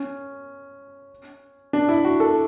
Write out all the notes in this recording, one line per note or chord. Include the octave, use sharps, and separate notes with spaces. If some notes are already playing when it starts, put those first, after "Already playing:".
Already playing: C#4
D4
E4
F#4
A4